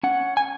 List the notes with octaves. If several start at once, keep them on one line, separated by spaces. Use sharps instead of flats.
C#4 F#5
G#5